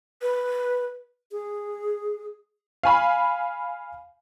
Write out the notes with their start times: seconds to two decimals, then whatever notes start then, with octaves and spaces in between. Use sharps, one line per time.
0.22 B4
1.32 G#4
2.83 F5 G#5 B5